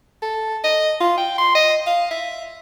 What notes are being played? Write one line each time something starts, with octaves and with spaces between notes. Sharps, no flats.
A4
D#5
F4
G5
C6
D#5
F5
E5